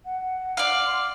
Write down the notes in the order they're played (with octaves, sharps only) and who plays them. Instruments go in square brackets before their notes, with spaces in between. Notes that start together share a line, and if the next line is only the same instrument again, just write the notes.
[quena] F#5
[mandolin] D5 F5
[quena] C6